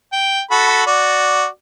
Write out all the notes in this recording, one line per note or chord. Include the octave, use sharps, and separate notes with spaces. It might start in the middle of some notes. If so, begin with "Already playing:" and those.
G5
F#4 A4 B5
F#4 D5